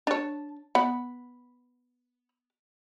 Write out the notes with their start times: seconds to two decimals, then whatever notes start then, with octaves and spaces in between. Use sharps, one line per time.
0.07 D4 C#5 A5
0.75 B3 F#5 B5